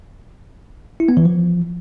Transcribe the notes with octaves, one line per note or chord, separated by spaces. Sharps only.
E4
B3
E3
F3